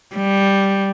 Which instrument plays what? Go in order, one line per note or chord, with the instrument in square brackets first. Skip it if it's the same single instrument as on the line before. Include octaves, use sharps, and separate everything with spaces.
[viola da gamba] G3